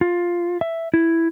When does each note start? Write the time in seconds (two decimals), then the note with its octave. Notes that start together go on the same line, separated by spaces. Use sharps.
0.01 F4
0.61 E5
0.94 E4